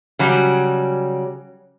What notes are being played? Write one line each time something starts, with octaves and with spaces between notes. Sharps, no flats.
C#3 F#3 G3